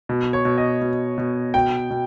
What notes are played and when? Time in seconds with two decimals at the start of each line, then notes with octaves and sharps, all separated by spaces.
0.09 B2
0.33 C#5
0.45 B2
0.58 D#5
0.81 B2
1.18 B2
1.54 B2 G5
1.90 B2